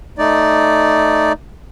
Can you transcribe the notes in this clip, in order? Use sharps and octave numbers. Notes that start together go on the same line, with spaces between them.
A3 D#4 D5